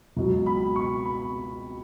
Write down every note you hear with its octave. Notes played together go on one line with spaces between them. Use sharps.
C#2 B2 F#3
B5
C#6
B5